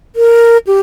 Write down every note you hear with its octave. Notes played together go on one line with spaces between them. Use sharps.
A#4
G4